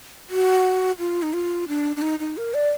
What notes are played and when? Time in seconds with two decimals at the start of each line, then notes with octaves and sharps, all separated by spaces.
0.30 F#4
0.99 F4
1.22 D#4
1.33 F4
1.68 D4
1.96 D4
2.02 D#4
2.19 D#4
2.37 A#4
2.54 D5